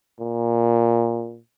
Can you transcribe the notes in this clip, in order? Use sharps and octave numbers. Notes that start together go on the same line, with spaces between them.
A#2